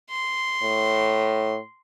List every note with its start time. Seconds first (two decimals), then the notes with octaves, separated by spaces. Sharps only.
0.11 C6
0.62 A2